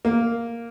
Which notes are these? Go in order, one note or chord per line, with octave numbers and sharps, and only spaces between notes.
A#3